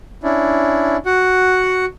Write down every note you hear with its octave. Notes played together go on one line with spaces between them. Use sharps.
C#4 D4 E4
F#4 F#5